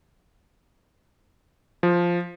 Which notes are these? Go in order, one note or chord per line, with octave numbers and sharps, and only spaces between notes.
F3